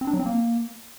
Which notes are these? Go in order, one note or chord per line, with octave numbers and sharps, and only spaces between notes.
C4
D4
F#3
C4
A#3